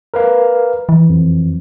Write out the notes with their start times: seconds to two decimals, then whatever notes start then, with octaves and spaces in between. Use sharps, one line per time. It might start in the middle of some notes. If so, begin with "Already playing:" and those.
0.14 A#4 B4 F5
0.89 E3
1.10 F2